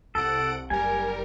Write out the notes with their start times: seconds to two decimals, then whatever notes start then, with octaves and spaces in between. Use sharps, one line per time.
0.15 C2 A4 F#5 D7
0.70 F#1 G3 A#4 G#5